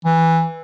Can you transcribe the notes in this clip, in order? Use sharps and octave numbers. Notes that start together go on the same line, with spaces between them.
E3